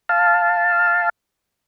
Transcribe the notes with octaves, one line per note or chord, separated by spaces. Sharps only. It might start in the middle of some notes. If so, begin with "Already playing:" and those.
F5 A5